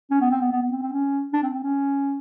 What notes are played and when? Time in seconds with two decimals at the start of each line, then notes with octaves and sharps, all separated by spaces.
0.11 C#4
0.21 B3
0.30 C4
0.41 B3
0.51 B3
0.62 B3
0.71 C4
0.82 C4
0.92 C#4
1.33 D4
1.43 C4
1.53 C4
1.63 C#4